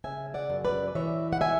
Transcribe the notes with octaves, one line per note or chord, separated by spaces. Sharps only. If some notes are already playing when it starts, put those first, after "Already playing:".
C#3 E5 G#5
D5 F#5
F#2
B4 D5
E3 C#5 E5
F#5
E5 G#5